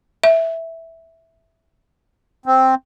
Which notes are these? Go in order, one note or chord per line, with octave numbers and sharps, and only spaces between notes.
E5
C4